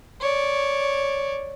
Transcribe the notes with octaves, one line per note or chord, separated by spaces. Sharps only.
C#5 D5